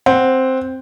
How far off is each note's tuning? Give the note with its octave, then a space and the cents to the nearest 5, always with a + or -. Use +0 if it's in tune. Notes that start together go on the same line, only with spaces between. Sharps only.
C4 +0 F#5 +0